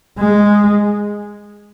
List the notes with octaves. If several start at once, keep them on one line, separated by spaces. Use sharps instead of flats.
G#3